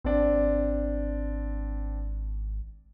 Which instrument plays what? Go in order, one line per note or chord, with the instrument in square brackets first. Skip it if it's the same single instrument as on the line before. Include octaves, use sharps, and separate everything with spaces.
[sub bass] G#1 [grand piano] C4 D4